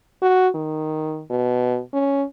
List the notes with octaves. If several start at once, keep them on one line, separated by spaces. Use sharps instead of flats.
F#4
D#3
B2
C#4